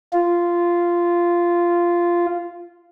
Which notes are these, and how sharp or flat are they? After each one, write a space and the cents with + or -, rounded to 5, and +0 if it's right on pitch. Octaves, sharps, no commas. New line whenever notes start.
F4 -10